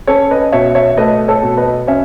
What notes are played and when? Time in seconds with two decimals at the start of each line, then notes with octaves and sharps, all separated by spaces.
0.07 C#4 A4 C#5
0.31 B4 D#5
0.52 B2 C#5 E5
0.75 C#5 E5
0.97 A3 B4 D#5
1.28 A4 C#5
1.43 B2
1.57 B4 D#5
1.87 C#4 C#5 E5